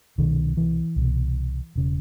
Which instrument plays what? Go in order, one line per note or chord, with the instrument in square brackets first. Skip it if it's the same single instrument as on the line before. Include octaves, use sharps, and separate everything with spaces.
[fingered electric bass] C2 B2 D#3
E3
C2 B2
E1 C#3